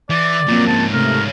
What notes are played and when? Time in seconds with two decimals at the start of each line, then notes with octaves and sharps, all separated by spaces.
0.10 E3 D5
0.48 A#2 F3 F#3 A#3 C4
0.67 G#2 C#3 A5
0.93 C3 A3 A#4